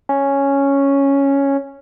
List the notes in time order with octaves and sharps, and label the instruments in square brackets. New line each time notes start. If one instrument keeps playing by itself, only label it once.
[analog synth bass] C#4